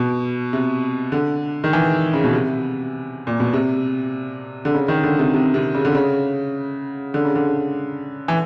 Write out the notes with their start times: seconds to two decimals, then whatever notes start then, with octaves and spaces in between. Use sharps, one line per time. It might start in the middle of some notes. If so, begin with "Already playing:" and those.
Already playing: B2
0.53 C3
1.12 D3
1.64 D#3
1.73 E3
2.13 C#3
2.24 B2
2.34 C3
3.27 A#2
3.40 B2
3.53 C3
4.65 D3
4.74 C#3
4.88 D#3
5.03 D3
5.19 C3
5.34 C3
5.54 C3
5.75 C#3
5.85 D3
5.95 C#3
7.14 D3
7.25 C#3
7.36 D3
8.28 E3